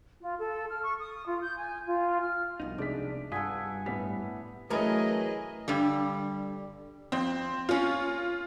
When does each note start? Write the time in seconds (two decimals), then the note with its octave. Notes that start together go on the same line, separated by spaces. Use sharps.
0.21 F4
0.38 A4
0.71 F6
0.82 C#6
1.00 D#6
1.27 F4
1.43 G6
1.55 G#5
1.86 F4
2.21 F6
2.60 C2 F2 B2 D#4
2.78 C2 G#3 D4 D5 B6
3.32 G2 F4 A4 F#5 G#5 D#6 B6
3.86 A2 G3 B3 B6
4.70 E3 F#3 A3 C#4 G#4 A#4 B4 D#5
5.68 G2 D3 G3
7.12 F2 C4
7.69 A#3 C#4 F4